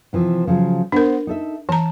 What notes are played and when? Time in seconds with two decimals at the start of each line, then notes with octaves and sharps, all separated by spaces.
0.13 C3 E3 F3
0.47 C#3 F3 F#3
0.92 B3 D4 A#4 C5
1.27 D#4 A4 E5
1.69 E3 A5 A#5